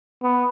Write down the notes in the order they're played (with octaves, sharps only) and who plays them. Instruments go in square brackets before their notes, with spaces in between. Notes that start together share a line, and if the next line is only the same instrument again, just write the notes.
[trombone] B3